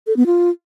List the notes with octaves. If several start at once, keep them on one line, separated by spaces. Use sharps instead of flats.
A4
B3
F4